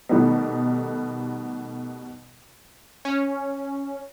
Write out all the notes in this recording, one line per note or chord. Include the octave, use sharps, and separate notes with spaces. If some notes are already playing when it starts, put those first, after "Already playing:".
B2 D#3 G3 A3 B3
C#4